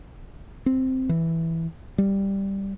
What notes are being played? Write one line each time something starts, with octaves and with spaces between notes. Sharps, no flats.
C4
E3
G3